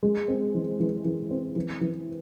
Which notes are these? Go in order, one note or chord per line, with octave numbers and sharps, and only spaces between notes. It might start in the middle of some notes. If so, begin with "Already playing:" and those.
G#3
C4
E3
E3
E3
C4
E3
E3